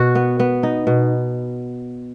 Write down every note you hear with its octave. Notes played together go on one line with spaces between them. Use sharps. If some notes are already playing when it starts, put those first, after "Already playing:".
Already playing: B2 F#4
B3
B3
D#4
B2